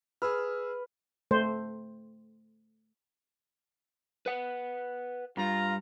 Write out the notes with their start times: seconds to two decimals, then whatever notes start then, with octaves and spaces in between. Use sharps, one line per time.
0.22 G#4 B4 E6 F6
1.31 A3 C5
4.26 B4 F#5
5.37 G2 G3 F4 A#5